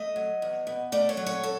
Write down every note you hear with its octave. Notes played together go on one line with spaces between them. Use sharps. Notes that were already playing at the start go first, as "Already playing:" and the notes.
Already playing: A3 D#5
F#3
E2
B2
A3 D5
C#5
F#3
C#5
A4